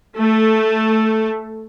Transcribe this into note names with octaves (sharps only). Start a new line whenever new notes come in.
A3 A4